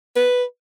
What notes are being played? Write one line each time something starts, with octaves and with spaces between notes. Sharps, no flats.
B4